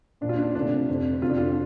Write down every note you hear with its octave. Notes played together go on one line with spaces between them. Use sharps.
A#1 A#2 D4
F4
D4
D2 C3 D4
F1 F2 C3
F1 F2 D3 F4
D4
F4